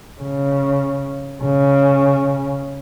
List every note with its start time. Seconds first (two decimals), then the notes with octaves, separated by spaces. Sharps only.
0.21 C#3
1.43 C#3